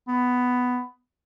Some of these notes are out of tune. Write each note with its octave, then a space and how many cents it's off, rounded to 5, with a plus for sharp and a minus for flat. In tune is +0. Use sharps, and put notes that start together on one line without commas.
B3 +10